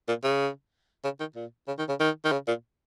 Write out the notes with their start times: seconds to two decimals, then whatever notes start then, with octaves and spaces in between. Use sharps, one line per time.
0.08 A#2
0.24 C#3
1.04 C#3
1.20 D#3
1.36 A#2
1.68 C#3
1.79 D#3
1.89 C#3
2.00 D#3
2.24 D#3
2.32 C#3
2.48 A#2